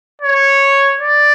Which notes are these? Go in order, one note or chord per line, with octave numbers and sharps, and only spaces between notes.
C#5
D5